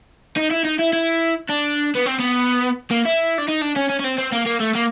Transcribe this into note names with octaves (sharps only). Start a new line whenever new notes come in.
D#4
E4
D#4
E4
E4
D4
B3
C4
B3
A#3
E4
D4
D#4
D4
C#4
C#4
C#4
C4
C4
A#3
A#3
A3
A#3